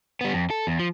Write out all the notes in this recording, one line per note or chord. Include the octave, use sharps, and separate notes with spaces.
G3 B3
F2
A4
E2
F3